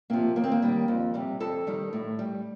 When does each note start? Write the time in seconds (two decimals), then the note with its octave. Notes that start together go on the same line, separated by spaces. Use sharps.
0.10 C3 F3 A#3
0.36 D#2 A#3
0.44 C4
0.52 A#3
0.62 D#3 G3
0.88 F2
1.14 C3 G3
1.40 F2 A4
1.67 D#3 G3
1.93 A2
2.19 G3